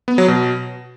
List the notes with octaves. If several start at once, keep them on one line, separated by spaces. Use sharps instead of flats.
B3
F#3
B2